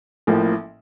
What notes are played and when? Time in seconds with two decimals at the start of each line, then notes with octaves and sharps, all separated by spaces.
0.27 A1 A2 F3 A#3